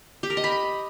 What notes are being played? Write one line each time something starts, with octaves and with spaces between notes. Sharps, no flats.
G4
A#4
D#5
B5